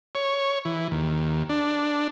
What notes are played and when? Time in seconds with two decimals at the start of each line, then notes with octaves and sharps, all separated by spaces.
0.15 C#5
0.65 E3
0.91 D#2
1.49 D4